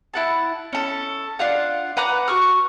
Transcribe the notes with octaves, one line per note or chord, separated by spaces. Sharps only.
E4 F#5 A5
C#4 A4
D4 F4 F5 F#5
B4 F#5 A#5 D6
F#4 C#6 F6